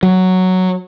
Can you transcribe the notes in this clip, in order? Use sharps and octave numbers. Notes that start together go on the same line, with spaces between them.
F#3